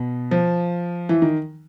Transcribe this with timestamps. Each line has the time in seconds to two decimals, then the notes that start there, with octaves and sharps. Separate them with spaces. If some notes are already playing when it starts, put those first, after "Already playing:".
Already playing: B2
0.31 F3
1.09 E3
1.22 D#3